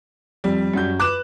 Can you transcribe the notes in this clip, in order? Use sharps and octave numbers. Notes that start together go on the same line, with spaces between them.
F2 G3
F#2 F#4 G6
B4 D6 F#6 E7